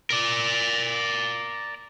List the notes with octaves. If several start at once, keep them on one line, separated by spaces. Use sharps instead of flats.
A#4 D5